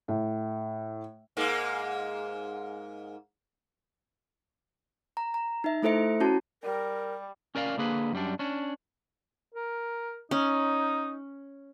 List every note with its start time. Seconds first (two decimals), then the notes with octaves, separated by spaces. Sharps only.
0.08 A2
1.37 G#2 G#3 A#3
5.17 A#5
5.34 A#5
5.64 D#4 E5
5.83 A3 E4 A4 C5 E5 C#7
6.20 C#4 E4 F#4 A5
6.63 G3 A#4
7.55 C#4 A#4 D5 E5 F5
7.78 D3 A#3 G#4 B4
8.13 F#2 G3 D4
8.39 C#4 D4
9.54 A#4
10.31 C#4 D#4